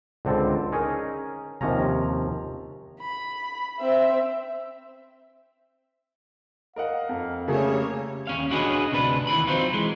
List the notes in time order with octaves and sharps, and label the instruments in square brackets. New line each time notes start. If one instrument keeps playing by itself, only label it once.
[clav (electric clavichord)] C#2 D3 C4 A4
C#4 D#4 G#4 A#4 D#5
D#2 C3 F3 C#4 A#5
[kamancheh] B5
C4 E5
[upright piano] A#4 D#5 F#5 [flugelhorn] F5
[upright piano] F2
[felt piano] C#3 A3 A#3 [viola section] G3 C#5 [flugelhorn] G#4
[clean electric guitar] D#2 C#4 F5
D4 F#4 G#4 B4 C#5 D#5
D2 C3 D4 B4
D#2 D#3 E3 B5
F#3 C4 D#4 F4
E3 G#3